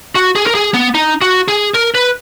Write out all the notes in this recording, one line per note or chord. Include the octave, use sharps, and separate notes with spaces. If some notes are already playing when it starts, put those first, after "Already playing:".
F#4
G#4
A#4
G#4
B3
D#4
F#4
G#4
A#4
B4